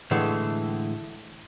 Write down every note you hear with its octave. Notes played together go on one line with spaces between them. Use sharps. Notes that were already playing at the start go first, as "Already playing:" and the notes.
A2 D3 E3 G#3 A3